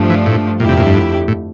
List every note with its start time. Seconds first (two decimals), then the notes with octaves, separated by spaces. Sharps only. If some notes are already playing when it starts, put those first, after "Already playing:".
Already playing: G2 F3 A3 D4
0.10 E3
0.26 A2
0.60 F2 A#2 D3 A3 E4 G4
0.69 C3
0.77 A#2
0.86 G2
1.28 A2